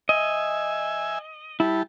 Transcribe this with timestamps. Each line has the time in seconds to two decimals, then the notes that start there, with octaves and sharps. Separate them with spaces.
0.09 D#5 E5 G#5
1.60 G3 E4 A5